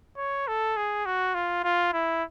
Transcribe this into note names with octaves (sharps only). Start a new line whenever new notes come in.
C#5
A4
G#4
F#4
F4
F4
E4